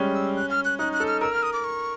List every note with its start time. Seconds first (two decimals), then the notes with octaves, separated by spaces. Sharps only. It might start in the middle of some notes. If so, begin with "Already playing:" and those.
Already playing: G3 G#3 C#4
0.15 E6
0.36 F#6
0.51 F6
0.65 F#6
0.79 D#4 F#6
0.93 F#6
1.00 A4
1.08 F6
1.21 A#4 E6
1.32 F6
1.43 D#6
1.53 D6
1.64 C#6